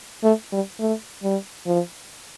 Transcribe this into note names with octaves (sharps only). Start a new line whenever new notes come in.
A3
G3
A3
G3
F3